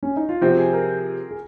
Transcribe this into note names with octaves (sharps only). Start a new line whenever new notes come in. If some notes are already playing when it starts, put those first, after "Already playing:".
C#4
D#4
F4
C3 F3 C4 F#4
G#4
A#4
G#4